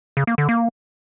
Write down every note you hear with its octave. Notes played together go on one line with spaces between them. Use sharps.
C#3
A#3
D3
A#3